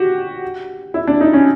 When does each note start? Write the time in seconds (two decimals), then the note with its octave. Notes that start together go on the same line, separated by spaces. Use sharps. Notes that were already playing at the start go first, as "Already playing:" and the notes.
Already playing: F#4 G4
0.94 E4
1.07 D4
1.21 D#4
1.33 C#4